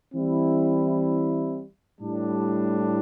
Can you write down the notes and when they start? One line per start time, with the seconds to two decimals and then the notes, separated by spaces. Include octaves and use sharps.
0.13 E3 G3 C4 E4
2.00 A2 G3 D4